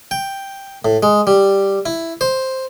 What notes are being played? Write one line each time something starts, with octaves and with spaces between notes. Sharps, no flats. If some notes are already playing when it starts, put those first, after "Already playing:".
G5
A2
G#3
G3
E4
C5